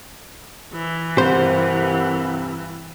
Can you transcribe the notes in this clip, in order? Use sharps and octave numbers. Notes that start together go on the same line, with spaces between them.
E3
G2 C3 A4 A#4 C5 F#5